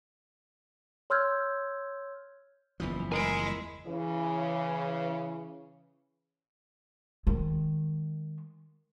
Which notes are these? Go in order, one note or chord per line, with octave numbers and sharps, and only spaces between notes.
C#5 C6 E6 F6 G6 G#6
F#1 E2 E3 F3
G#3 E4 A#4 D#5 G#5 D7
C#3 E3
D#3 G#3